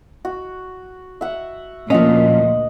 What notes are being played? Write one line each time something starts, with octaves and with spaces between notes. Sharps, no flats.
F#4
E5 F#5
D2 A#2 F3 C#4 D#5 F#5